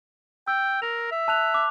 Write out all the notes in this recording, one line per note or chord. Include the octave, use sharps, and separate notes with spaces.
G5 E6
A#4 F7
E5
A5 F#6 F7
D6